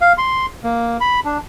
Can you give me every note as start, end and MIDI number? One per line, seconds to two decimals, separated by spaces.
0.01 0.13 77
0.18 0.46 84
0.64 0.97 58
1.01 1.20 83
1.25 1.38 62